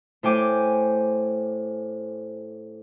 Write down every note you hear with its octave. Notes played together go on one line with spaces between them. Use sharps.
A2 C5 G5 G#5 D6 G6